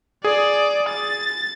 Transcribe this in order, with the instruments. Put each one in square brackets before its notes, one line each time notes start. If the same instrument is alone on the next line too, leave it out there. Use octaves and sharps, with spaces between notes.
[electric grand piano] G#4 [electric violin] D5
[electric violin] A6